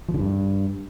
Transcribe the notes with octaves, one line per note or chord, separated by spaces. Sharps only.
F3
D3
G2